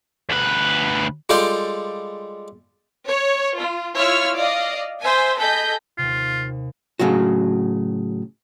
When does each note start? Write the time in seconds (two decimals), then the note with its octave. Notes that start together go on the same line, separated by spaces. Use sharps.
0.30 D2 B4
1.29 G3 G#3 F4 A4 D5 G5
3.07 C#5
3.56 F4
3.95 E4 F4 C#5 E6 F6
4.36 D5 D#5 F5
5.02 C5 E5 G#5
5.37 G#4 A4 D#5 B5 G6
5.98 D#2 C3 F4
6.99 A2 C#3 F#3 F#4